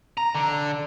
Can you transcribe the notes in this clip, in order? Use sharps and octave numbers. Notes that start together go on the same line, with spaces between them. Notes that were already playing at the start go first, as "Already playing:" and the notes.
A#5
D3